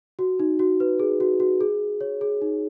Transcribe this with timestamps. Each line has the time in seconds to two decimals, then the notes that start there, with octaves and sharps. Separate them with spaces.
0.19 F#4
0.40 D#4
0.59 F#4
0.80 B4
1.00 G#4
1.20 F#4
1.40 F#4
1.61 G#4
2.01 C#5
2.21 G#4
2.42 D#4